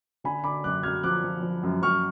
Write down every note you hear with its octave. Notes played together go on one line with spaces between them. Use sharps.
D3 G#5 B5
D3 B5 D6
F#2 D6 F#6
F#2 F6 G#6
F3 D6 F#6
F3
F3
F#2
F#2 C#6 F6